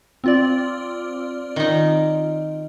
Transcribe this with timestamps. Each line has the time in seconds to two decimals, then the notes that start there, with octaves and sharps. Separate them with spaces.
0.24 C4 F4 D5
1.56 D#3 D#4